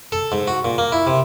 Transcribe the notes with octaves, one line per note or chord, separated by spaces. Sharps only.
A4
G#2
F#4
A#2
A#3
E4
C3